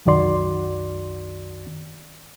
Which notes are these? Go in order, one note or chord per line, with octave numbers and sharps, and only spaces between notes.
C2 F#2 D#3 F#4 D5 C6